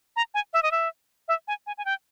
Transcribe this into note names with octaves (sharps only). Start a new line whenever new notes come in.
A#5
G#5
E5
D#5
E5
E5
G#5
G#5
G#5
G5